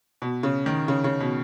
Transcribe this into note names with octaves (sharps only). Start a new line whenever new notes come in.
B2
C#3
D#3
C#3
C#3
B2